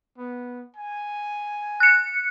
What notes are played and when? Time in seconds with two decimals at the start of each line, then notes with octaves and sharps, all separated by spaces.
0.18 B3
0.77 G#5
1.80 F#6 C#7